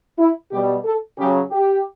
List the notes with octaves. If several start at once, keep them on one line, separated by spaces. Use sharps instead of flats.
E4
B2 G3 G4
A4
C#3 F#3 G4
G4